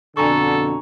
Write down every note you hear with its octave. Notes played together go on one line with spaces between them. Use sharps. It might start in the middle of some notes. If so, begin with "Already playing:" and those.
F2 B2 D3 A4 G#5 A#5 C#6